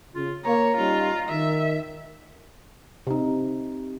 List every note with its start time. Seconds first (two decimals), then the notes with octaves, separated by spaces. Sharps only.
0.15 C#3 F4
0.45 A#3 C#5 A#5
0.77 G3 C#4 D#4 F4
1.29 D#3 E5
3.07 C3 D#4